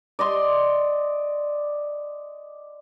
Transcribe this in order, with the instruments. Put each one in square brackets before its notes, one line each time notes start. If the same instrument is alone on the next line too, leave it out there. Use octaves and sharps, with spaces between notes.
[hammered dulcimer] D5 D#5 C6